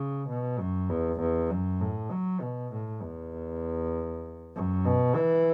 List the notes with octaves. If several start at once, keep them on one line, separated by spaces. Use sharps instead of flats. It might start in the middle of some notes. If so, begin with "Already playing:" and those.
Already playing: C#3
B2
F#2
E2
E2
F#2
A2
F#3
B2
A2
E2
F#2
B2
E3